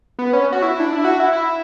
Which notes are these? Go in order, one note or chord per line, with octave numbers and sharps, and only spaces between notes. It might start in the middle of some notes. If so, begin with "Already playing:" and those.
B3
C#4
F#4
E4
D4
E4
F#4
E4
E4